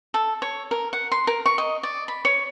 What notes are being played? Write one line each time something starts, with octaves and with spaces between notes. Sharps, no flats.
A4
C#5
A#4
F#5
C6
A#4
C#6
D#5
D5
B5
C#5